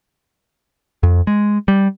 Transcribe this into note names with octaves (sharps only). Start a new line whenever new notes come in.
F2
G#3
G3